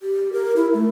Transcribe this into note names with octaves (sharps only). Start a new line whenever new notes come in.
G4
A#4
E4
A3